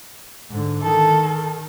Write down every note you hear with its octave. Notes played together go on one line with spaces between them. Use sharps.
G#2 D3
D#3 A4